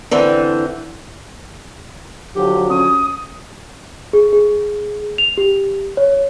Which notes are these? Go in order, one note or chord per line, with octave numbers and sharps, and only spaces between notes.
D3 E3 C4
D3 F3 F#3 G4
C#4 D#6
G#4
G#4
F7
G4
C#5